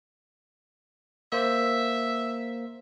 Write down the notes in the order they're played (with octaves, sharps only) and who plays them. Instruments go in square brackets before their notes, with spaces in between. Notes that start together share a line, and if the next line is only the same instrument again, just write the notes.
[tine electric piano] A#3 C5 [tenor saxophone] E5